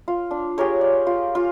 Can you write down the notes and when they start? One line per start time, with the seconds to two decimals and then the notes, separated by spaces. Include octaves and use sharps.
0.08 F4
0.31 D4
0.58 G4 G#4 A#4 C#5
0.81 D5
1.07 F4
1.35 F4